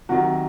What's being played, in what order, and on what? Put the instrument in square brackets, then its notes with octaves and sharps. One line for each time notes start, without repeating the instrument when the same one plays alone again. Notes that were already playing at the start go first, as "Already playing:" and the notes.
[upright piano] C3 D#3 F#3 F#4